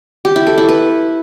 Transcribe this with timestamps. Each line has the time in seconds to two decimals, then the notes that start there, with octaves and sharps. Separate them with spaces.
0.25 G4
0.36 E4
0.47 A4
0.58 E4
0.69 B4